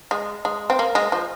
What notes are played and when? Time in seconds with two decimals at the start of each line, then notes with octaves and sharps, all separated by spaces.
0.11 G#3
0.45 G#3
0.70 C4
0.79 A#3
0.95 G#3
1.12 F3